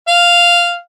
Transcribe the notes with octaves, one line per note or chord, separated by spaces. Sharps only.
F5